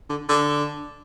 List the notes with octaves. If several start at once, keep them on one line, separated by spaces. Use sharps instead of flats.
D3
D3